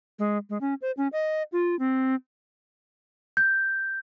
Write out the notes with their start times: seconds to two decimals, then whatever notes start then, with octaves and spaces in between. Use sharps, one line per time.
0.19 G#3
0.50 G#3
0.61 C#4
0.82 C5
0.97 C#4
1.13 D#5
1.52 F4
1.79 C4
3.37 G6